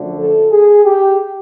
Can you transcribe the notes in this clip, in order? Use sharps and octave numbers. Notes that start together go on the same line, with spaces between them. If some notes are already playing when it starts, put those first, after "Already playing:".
Already playing: F#2 D3 F3 A3
A4
G#4
G4